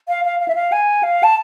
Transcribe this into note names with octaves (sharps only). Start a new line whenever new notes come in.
F5
F5
F5
E5
F5
G#5
F5
A5